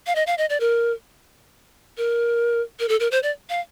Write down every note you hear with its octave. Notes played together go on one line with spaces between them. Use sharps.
F5
D#5
F5
D#5
D5
A#4
A#4
A#4
A4
A#4
C5
D5
F5